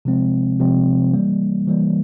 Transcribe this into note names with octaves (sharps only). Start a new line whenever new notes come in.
C3 F3 G#3 C4
C3 F3 G#3 C4
E3 G3 A#3
E3 G3 A#3